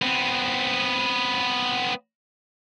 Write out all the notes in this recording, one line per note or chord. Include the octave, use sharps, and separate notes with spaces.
B3 C4